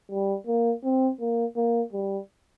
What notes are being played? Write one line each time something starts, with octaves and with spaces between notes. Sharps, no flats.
G3
A#3
C4
A#3
A#3
G3